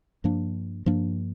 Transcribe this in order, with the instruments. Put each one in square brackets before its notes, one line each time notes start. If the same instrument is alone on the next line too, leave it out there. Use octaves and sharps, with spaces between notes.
[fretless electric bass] G2 F3 A#3 D4
G2 F3 A#3 D4